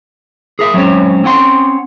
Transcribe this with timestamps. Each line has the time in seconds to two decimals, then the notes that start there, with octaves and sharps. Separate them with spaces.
0.59 G#4 A#4 E5
0.74 F#3 G#3 C4 C#4 C#5
1.24 C4 C#4 F#5 C6